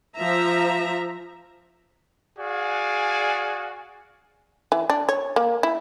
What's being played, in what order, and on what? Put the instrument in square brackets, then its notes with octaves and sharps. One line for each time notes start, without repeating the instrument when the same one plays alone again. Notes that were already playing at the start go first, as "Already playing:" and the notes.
[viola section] F3 E5 A#5
[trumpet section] F#4 G#4 D5 F5 G#5
[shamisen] E3
D4
C#5
A#3
E4